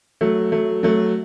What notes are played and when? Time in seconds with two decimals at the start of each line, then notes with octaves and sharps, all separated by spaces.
0.21 F#3 A3
0.52 F#3 A3
0.83 F#3 A3